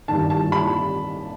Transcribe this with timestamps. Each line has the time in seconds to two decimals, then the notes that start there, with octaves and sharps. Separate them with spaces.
0.08 G2 D#3 A5
0.30 A5
0.52 B5